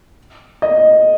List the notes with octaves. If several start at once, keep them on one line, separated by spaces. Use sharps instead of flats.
D#5